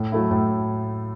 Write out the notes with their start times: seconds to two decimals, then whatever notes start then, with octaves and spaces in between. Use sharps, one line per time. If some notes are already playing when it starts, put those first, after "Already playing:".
Already playing: A2
0.12 F#3 A3 E4
0.31 A2